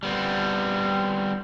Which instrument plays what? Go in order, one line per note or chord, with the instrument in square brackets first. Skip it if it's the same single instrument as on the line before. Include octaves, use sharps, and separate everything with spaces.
[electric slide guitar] G3 B3 C4